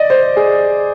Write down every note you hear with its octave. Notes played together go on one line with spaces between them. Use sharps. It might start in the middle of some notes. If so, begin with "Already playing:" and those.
Already playing: D5 D#5
C5
G#4